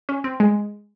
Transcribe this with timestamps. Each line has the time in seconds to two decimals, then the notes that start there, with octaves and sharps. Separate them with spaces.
0.09 C#4
0.24 C4
0.40 G#3